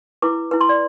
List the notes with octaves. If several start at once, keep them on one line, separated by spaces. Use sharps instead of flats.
E4 B4 D6
E4 B4
C6
D5